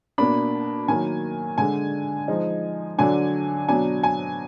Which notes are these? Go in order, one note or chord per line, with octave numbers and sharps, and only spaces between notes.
B2 A#3 D4 B5
D#3 F#3 A#3 G#5
D3 G#3 D4 G#5
F3 G#3 D#4
D3 F#3 D4 G#5
B2 F#3 D4 G#5
G#5